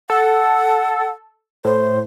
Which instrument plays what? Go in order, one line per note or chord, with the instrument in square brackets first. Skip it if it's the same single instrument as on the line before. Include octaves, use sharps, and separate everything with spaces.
[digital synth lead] A4 [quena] F#5
[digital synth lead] A2 [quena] C5